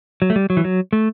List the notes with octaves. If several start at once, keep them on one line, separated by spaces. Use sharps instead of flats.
F#3
A3
G3
F#3
E3
F#3
A3